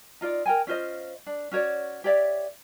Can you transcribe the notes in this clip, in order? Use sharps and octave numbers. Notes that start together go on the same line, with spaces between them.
D#4 F4 D5
A#4 G5 G#5
C#4 F4 C5 D#5
D4
C#4 F#4 C#5 D5
G4 C#5 D5 E5